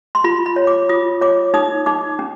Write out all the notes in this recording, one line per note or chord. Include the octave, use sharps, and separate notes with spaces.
C6
F4 B5
B5
C#5
D6
F4 D#6
C#5 D6
D#4 D#6
D#4 D6
C#4